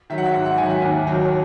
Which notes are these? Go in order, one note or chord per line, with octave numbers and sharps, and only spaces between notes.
D#3 F#3 E5
F#5
E5
G#2 F#5
F#5
D#3 G#5
F#3
E5
D#2
D#3 F#3